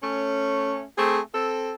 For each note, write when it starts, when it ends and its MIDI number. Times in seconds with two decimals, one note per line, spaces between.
0.02 0.83 57
0.02 0.83 61
0.97 1.20 57
0.97 1.20 60
0.97 1.20 68
1.34 1.74 60
1.34 1.74 69